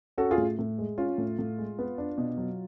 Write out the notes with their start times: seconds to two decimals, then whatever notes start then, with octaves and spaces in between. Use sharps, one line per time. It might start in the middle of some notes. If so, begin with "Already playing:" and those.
0.18 C#4 F#4 A4
0.31 F4 G#4
0.38 A2
0.59 A2
0.78 G#3
0.98 C#4 F4
1.18 A2
1.39 A2
1.58 G#3
1.79 B3
1.98 D4
2.18 B2
2.38 F#3